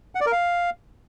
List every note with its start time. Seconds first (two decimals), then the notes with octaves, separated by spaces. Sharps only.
0.15 F#5
0.21 D5
0.26 A#4
0.32 F5